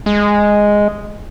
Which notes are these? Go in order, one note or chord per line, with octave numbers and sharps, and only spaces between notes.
G#3